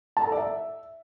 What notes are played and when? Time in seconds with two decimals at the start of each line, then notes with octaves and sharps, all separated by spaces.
0.17 A5
0.22 A#5
0.27 A4
0.32 D5
0.37 E5